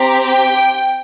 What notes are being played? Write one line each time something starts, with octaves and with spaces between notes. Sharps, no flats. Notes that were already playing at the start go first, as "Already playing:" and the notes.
Already playing: C4 G4 A#5
G5